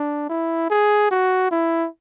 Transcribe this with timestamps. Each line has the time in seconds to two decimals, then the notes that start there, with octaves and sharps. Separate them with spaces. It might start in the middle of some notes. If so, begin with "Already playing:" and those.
Already playing: D4
0.30 E4
0.70 G#4
1.11 F#4
1.51 E4